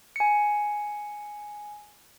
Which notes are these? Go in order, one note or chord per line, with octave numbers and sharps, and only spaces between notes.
G#5 C#7